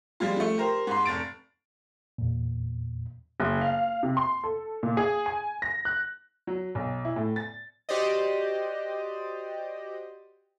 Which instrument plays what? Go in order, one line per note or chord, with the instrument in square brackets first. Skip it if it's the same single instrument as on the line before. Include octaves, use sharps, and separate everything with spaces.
[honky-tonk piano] F3 G3 G#3 F4
F3 A3
G4 A#4 C5
G#2 C6
F1 A6 D7
[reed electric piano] E2 A#2
[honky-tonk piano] F#1
F5
C3
C6
A4
A#2
G#4
G#5
A#6
F#6
[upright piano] F#3
B1
E4
A2
A6
[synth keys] F#4 G4 C5 D5 D#5